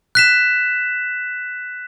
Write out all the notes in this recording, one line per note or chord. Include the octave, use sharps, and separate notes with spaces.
F#6 B6 E7